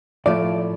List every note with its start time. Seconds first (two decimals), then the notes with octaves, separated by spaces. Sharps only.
0.26 A2 F3 A3 D5